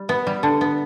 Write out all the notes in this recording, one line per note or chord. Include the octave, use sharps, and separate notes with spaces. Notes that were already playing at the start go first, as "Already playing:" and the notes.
Already playing: G3
B3
G3
D3
B3